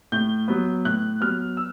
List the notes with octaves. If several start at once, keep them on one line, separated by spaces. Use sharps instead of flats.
A2 G6
F#3 B3
A2 F#6
F#3 B3 F6
E6